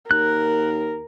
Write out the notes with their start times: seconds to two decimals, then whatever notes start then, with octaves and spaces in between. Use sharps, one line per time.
0.11 D#2 A#4 F#6